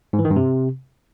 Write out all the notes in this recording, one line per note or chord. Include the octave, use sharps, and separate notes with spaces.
G#2
E3
D#3
G2
C3